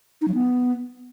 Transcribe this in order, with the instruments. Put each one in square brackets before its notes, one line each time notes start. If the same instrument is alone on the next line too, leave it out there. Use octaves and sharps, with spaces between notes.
[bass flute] D#4
F#3
B3